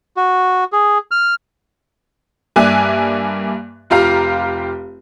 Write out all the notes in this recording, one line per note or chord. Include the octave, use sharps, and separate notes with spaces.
F#4
G#4
F6
G2 A#3 D5 E5 G#5 F#6
F1 F4 G4 F5 A#5 F6